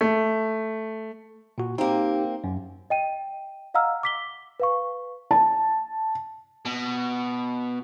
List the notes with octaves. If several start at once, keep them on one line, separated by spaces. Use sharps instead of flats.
A3
A#2 F#4
A#3 C4 D#4 G4
F#2
D#5 G5 D#7
D#5 F5 F#5 A#5 E6 F6
D6 B6 G7
B4 F5 C#6
A5
B2